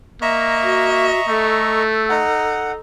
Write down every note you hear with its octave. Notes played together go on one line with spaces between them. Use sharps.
A#3 D#5 E5 A#5 C#6
F#4
A3 A4
D#4 F#5